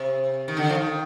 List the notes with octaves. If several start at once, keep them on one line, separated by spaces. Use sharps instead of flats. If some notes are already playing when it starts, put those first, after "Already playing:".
Already playing: C3
D#3
D3
F3
D#3